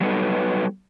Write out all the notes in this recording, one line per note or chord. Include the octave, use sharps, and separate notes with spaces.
F#3 G3 B3 D#4 A4 B4